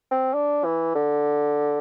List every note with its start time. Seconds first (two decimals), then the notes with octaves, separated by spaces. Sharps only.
0.11 C4
0.34 D4
0.65 E3
0.95 D3